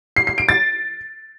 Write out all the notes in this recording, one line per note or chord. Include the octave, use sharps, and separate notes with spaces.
C7
C7
D7
A6